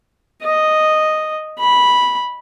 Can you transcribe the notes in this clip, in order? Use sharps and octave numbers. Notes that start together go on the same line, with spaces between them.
D#5
B5